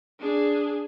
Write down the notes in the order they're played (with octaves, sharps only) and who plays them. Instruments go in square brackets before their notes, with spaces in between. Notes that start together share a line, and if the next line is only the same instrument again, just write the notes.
[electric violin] D4 G#4